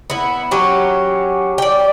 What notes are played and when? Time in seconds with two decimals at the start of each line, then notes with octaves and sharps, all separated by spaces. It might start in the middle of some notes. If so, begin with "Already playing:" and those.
0.10 B3 E4
0.51 F#3 C#4 G4
1.58 D5 G5